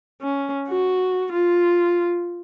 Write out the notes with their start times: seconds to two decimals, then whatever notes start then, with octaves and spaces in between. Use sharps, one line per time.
0.22 C#4
0.69 F#4
1.32 F4